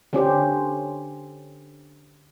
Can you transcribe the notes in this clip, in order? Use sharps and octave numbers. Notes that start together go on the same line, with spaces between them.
D3 C#4 G4 C5